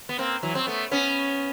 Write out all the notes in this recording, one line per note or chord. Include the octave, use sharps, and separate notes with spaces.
B3
A#3 C4
E3 F#3
C4
A3 B3
B3 C#4